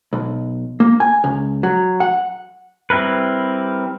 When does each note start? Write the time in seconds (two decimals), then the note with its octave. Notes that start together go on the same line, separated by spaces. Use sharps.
0.13 B1
0.80 A#3
1.00 G#5
1.24 C#2
1.63 F#3
2.00 F#5
2.90 G3 C4 E4 A#4 B4